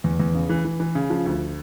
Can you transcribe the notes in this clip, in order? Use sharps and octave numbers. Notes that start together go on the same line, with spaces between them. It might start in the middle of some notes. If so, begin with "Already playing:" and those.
E2
E2
C#3
E3
E3
E3
C#3
F3
D2